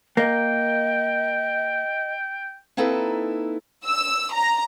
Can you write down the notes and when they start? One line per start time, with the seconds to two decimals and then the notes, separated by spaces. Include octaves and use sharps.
0.17 A#3 D#5 G5
2.77 A#3 C4 D#4 E4 A4 B4
3.85 E6
4.33 A#5